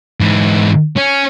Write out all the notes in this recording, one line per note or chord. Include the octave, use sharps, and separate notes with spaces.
G#2 E3
C#4